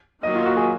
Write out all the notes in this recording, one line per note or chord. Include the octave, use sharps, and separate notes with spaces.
D#3 F#3 A#3 D#5
F4
F#4
G#4